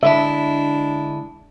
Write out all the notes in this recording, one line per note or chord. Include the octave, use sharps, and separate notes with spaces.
D3 G#3 D4 E4 E5